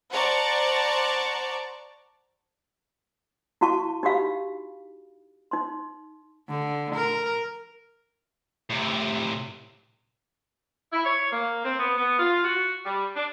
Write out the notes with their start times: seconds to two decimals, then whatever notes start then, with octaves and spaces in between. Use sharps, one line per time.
0.12 C5 D5 F#5 A5 A#5 C#6
3.61 E4 F#4 F5 A5 C#6
4.03 D#4 F#4 G4 F5 B5
5.51 D#4 C6
6.49 D3
6.95 A#4
8.70 A2 C3
10.92 E4
11.05 C#5
11.31 A#3
11.65 C4
11.80 B3
11.98 B3
12.19 F4
12.44 F#4
12.85 G3
13.16 D4